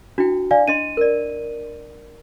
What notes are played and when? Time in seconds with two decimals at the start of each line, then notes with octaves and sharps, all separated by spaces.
0.18 D4 E4 F#4 G5
0.51 D5 F5 G#5
0.68 D4 D#5 C6 D#7
0.97 A#4 D5